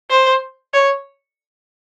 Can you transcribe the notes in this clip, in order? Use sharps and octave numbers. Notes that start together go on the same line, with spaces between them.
C5
C#5